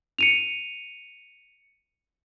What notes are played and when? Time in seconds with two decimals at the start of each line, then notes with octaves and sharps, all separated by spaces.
0.19 C#7 D#7 F7